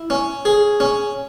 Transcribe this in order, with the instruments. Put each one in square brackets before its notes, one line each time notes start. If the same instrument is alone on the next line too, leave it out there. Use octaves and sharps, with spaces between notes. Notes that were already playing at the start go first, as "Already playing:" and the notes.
Already playing: [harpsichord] E4
C#4
G#4
C#4